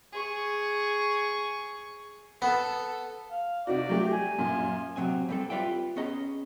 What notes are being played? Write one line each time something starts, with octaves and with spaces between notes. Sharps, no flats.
G#4 C#6
B3 A4
F5
C3 D#4 F#4 D5
F#3 A3 G4
G#5
F#2 A#2
C3 D#3 F#3 C4 G#5
G3 A#3 C4 G#4 A4
F4 G4 B4 D5 E5 G5
B3 C#4 G#4 D#5 A#5